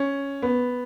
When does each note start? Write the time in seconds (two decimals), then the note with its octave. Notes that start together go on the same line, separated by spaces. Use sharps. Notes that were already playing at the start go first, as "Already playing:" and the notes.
Already playing: C#4
0.42 B3